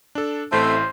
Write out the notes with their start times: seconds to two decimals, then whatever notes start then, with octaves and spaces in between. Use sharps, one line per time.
0.15 D4 A4
0.52 A1 A3 C4 E4 C5